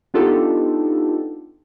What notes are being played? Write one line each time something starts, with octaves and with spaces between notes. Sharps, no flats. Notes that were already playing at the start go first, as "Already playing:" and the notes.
B3 D4 D#4 F4 G4 A4